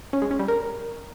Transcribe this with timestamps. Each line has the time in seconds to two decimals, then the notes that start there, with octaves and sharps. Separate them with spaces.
0.13 C#4
0.22 G#3
0.31 C#4
0.39 G3
0.48 A#4